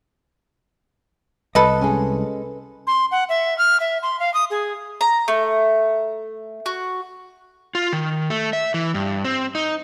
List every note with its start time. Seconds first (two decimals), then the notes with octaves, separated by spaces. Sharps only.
1.55 C2 A4 B4 D#5 B5
1.81 G#3 C#4
2.87 C6
3.11 F#5
3.29 E5
3.58 F6
3.80 E5
4.03 C6
4.20 F5
4.34 D#6
4.50 G#4
5.01 A#5
5.28 A3
6.66 F#4
7.75 F4
7.93 D#3
8.30 A3
8.53 E5
8.74 E3
8.94 G2
9.25 C4
9.55 D#4